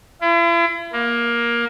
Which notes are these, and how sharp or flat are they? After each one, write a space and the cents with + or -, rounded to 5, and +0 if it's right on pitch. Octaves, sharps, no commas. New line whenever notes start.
E4 +45
A#3 +15